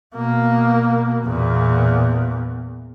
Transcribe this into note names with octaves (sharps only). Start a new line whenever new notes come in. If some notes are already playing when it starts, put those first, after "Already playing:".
B2 A#3
E2 A#2